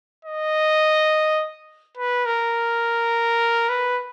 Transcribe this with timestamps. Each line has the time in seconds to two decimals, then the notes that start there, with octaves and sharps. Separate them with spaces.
0.25 D#5
1.97 B4
2.26 A#4
3.69 B4